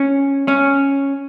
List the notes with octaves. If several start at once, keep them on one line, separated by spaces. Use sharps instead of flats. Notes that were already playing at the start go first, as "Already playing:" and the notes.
Already playing: C#4
C#4